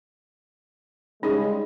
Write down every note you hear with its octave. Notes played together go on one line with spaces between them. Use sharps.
C#3 G3 G#3 D#4 G#4